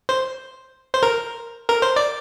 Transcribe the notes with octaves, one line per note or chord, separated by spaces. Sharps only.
C5
C5
A#4
A#4
C5
D5